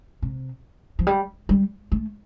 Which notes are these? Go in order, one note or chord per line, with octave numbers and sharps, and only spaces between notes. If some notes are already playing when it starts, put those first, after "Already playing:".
C3
F3
G3
G3
A3